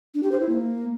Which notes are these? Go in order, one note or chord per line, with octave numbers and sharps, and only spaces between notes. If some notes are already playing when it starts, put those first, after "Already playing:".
D4
G4
C5
E4
A#3